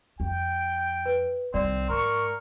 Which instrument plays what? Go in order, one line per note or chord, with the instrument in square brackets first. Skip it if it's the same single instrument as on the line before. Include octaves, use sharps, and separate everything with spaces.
[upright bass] F2 [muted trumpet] G5
[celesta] B4
[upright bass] C2 D#3 [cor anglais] C4 [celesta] D5
[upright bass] G#2 [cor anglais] A#4 [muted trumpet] C#6